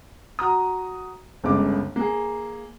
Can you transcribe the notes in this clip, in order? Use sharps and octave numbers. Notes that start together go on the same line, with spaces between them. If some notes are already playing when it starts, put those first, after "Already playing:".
F#4 A#5 D#6
G1 C#2 C#3 D6
A#3 G#4